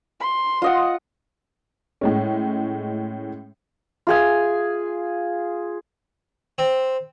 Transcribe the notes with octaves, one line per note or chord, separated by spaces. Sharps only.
C6
F4 D#5 F#5
A2 G#3 C#4
F4 G#4 G#5
C4